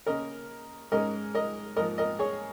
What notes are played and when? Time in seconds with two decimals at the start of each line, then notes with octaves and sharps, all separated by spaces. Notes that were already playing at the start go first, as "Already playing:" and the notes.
0.06 C#3 A#3 C#4 A#4 D#5
0.92 G#2 G#3 C#4 A#4 D#5
1.35 A#4 D#5
1.76 G#2 F3 A#3 A#4 D#5
1.98 A#4 D#5
2.19 G#4 C#5